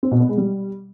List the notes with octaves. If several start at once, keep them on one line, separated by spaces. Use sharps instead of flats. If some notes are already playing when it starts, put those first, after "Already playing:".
C4
B2
B3
G#3
G3